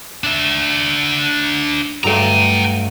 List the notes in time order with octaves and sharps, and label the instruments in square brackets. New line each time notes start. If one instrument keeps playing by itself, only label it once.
[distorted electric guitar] D4 E5
[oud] G2 F#3 A3 [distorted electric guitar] G5 A#5